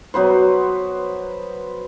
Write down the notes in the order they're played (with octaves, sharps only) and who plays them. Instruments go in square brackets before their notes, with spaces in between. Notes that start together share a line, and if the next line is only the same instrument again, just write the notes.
[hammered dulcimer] F#3 B3 B4 C5